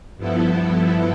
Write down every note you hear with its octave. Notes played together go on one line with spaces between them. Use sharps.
G2 F3 B3 E4 A4